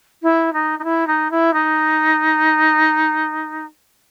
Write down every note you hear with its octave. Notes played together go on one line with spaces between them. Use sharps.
E4
D#4
D#4
E4
D#4
E4
D#4